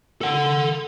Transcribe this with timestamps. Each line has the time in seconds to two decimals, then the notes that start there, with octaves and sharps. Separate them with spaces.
0.21 A4 F#5